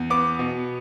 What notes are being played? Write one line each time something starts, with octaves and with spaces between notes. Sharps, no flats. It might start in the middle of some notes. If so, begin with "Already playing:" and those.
Already playing: E2
B3 D6
B2